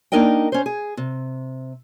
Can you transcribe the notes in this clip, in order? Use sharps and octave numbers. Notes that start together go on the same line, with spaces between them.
A#3 D4 D#4 A#4 D#5 G5
C#4 C5
G#4
C3